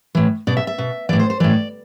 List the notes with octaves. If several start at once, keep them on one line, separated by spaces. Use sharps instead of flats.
A2 E3
B2 D5
E5
E5
B2
A2 E3 D5
C5
C5
A2 E3 D5